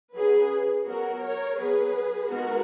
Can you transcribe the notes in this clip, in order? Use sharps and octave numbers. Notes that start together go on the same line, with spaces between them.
F#3 C#4 G#4 B4
F#3 B3 F#4 A#4
A#4 C#5
F#3 B3 G#4 B4
D#3 G#3 B3 F#4 A#4